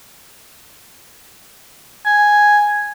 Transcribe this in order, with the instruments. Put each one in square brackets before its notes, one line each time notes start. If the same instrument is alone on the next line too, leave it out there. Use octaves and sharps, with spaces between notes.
[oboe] G#5